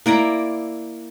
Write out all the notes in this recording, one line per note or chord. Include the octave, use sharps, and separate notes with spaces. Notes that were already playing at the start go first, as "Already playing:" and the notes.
A#3 E4 D5 A#5